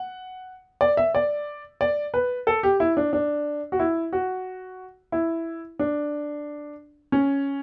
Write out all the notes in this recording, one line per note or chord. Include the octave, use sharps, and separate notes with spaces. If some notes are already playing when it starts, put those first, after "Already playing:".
Already playing: F#5
D5
E5
D5
D5
B4
A4
G4
E4
D4
D4
F#4
E4
F#4
E4
D4
C#4